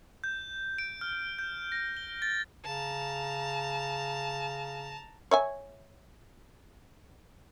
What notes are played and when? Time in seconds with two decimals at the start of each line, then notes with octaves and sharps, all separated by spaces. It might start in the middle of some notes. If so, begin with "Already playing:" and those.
0.24 G6
0.78 D7
1.01 F6
1.39 G6
1.72 A#6
1.97 G7
2.22 A6
2.64 C#3 A5 A#5
5.31 C#5 E5 G#5